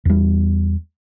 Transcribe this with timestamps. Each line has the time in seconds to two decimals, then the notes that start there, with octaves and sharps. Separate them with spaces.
0.05 E2 G3